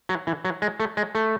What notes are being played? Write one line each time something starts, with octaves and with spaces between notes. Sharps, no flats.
F#3
E3
F#3
G#3
A3
G#3
A3